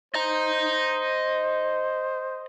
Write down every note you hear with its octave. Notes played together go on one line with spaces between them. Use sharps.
C5 D#5 A#5